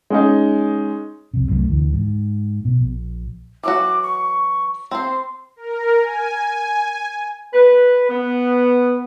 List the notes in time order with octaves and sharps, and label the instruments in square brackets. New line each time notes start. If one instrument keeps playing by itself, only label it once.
[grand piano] G#3 C#4 D#4
[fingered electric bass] C2 F2 C3
C2 F#2 F#3 A3
D2 D3 E3
G#2
B2
A#1
[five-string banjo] E3 F#3 F#4 [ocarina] D6
[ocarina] C#6
[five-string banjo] C4 C5 [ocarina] C6
[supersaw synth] A#4
G#5
[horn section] B4
B3